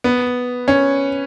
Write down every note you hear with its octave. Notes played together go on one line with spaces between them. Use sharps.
B3
C#4